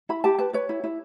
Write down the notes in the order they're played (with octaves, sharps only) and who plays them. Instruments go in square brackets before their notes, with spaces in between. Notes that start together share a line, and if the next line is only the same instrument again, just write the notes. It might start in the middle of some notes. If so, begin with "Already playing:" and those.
[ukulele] E4 B5
G4 A5
B4 A5
B4 C#5
E4
E4